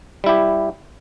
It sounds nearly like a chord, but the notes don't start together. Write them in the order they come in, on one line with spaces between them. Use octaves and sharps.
G3 E4 G4